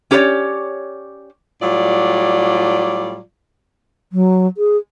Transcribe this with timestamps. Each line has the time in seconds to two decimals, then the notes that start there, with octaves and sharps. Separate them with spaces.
0.11 C#4 G4 A#4 B4 C#5 D5
1.62 A2 F#3 G3 F4 D5
4.12 F#3
4.57 G#4